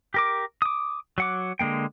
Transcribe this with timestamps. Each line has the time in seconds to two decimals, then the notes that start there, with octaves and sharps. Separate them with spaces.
0.14 G4 A#4 D6
0.62 D6 D#6
1.18 F#3 F#5 D6
1.59 D3 G#3 A#3 G5